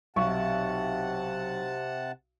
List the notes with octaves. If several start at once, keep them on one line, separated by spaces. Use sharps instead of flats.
B1 C3 F#5 A5 C#6